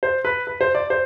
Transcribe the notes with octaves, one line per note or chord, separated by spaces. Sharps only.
C5
B4
B4
C5
D5
C5